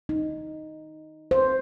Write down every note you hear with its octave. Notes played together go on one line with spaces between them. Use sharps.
D#4
C5